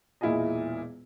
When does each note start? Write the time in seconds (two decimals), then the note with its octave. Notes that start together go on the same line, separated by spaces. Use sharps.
0.21 E1 A#2 E4 F4 G#4 D#5